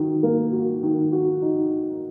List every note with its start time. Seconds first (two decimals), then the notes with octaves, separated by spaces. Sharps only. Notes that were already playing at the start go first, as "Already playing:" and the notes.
Already playing: D#3 F#4
0.23 A#3
0.52 F#4
0.83 D#3
1.12 F#4
1.42 D#4